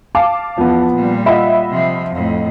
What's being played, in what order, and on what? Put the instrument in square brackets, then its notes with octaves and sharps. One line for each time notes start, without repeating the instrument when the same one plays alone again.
[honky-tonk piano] F5 A5 D6
[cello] E2 [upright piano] F3 B3
[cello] A#2 G3
[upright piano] F4 D#5 F#5 [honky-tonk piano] E5 B5
[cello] C3 F3
F2 A2